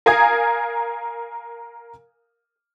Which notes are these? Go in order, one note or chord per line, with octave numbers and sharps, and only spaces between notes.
A#4 F5 G#5 A#5 D#6 G#6